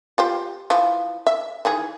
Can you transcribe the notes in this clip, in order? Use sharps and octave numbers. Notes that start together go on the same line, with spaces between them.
F4 G4 C5
E3 F3
E5
D#3 E3 G#4